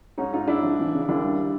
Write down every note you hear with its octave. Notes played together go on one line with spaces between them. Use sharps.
G#2 C#4 D#4
G#2 D#4 F4
G#2 D4 E4
F3
E3
C#3
D#2 D4 E4
G3